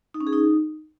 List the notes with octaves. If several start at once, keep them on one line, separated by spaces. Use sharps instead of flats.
D#4
C#4
G#4
D#4